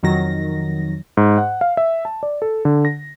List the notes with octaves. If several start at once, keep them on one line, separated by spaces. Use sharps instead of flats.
F2 D#3 F#3 A#6
G#2
F#5
F5
E5
A5
D5
A4
D3
A#6